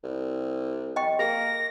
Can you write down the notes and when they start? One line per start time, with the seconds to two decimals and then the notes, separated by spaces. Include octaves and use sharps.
0.04 C2
0.96 D#5 G5 C#6
1.19 A#3 G#4 A#6